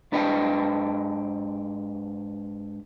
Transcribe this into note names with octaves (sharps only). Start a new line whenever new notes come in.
G#2 D4 B4 D#5 G5